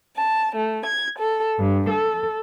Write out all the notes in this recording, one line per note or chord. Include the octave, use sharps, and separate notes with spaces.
A5
A3
G#6
A4
G2
A4